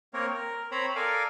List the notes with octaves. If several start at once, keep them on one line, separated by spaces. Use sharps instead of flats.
A#3 C4 A#4 C#5
A#4
C4 C5 C#5 A#5 B5
A4 A#4 D5 F5 G#5